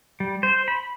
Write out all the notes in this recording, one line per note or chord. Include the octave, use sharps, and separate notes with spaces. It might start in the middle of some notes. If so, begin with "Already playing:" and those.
G3
C5
B5